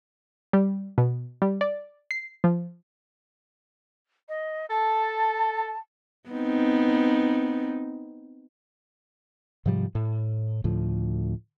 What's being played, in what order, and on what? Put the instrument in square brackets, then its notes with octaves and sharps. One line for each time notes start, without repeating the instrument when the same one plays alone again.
[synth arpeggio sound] G3
B2
G3
D5
C7
F3
[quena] D#5
[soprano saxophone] A4 [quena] A5
[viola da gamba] B3 C4 D#4
[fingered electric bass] G#2 C3 F3 G3
A2
D2 A2 F3